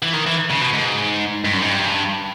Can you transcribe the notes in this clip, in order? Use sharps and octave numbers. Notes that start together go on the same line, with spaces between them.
E3
D#3
E3
C#3
B2
G#2
G2
F#2
G#2
G2